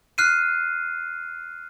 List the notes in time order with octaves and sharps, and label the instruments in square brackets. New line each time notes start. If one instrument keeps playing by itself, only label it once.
[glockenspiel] F6 F#6 C7 D#7